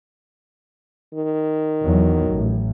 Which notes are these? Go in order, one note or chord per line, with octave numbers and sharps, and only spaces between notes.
D#3
E2 F#3
A1 A2